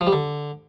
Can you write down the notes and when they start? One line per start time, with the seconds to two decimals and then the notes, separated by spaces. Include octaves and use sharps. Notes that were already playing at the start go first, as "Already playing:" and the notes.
0.01 F3
0.07 G3
0.13 D3